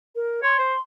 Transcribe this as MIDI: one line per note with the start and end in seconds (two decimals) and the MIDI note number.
0.15 0.41 70
0.43 0.58 73
0.43 0.80 84
0.59 0.74 72